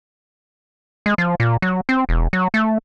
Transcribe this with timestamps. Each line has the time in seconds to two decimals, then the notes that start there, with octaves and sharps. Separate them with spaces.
1.06 G#3
1.18 F3
1.40 A#2
1.62 F#3
1.89 C4
2.09 E1
2.33 F#3
2.54 A3